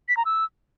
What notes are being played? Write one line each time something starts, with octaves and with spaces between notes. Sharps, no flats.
B6
A#5
E6